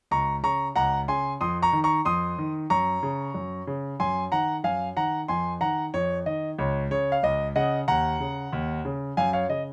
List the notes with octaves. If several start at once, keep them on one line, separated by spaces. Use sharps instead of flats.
C#2 A#5 C#6
C#3 A#5 C#6
C#2 F#5 A#5
C#3 G#5 C6
F2 C6 D#6
A#5 C#6
D#3
A#5 C#6
F2 C6 D#6
D#3
F#2 A#5 C#6
C#3
F#2
C#3
F#2 G#5 C6
D#3 F#5 A#5
F#2 F5 G#5
D#3 F#5 A#5
F2 G#5 C6
D#3 F#5 A#5
F2 C#5
D#3 D#5
C#2 C#5
C#3 C#5
F5
C#2 D#5
C#3 D#5 F#5
D#2 F#5 A#5
C#3
D#2
C#3
F#2 F5 G#5
C#5 F5
C#3 D#5